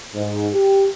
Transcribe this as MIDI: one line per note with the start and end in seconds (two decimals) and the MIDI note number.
0.15 0.48 44
0.54 0.85 67